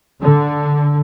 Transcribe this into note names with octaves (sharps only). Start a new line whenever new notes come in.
D3